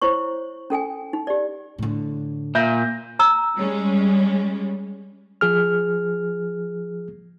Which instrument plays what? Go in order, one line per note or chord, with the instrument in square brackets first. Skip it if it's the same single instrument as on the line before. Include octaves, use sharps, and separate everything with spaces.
[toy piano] E4 C5 C#5 C#6
C#4 A4 G5 G#5
D#4
G4 D5
[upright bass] A2 D3
[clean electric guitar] A#2 [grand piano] E5 G6 A#6
[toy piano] A#5 E6
[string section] G3 G#3 C#4
[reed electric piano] F3 G#4 F6